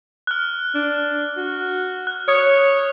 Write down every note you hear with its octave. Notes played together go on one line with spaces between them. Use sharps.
F6 F#6
D4
F#4
F#6
C#5 D#6